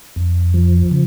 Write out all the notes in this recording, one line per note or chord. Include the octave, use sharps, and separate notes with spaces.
F2
F3
C#3